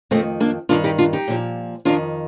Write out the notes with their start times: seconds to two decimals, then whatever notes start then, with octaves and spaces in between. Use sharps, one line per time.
0.11 F2 D#3 A3 C4
0.40 A#3 D4
0.69 G2 D#3 D4 F4
0.84 D#4 G4
0.98 D4 F4
1.13 D#4 G4
1.28 A#2 F3
1.85 F2 D#3 D4 F4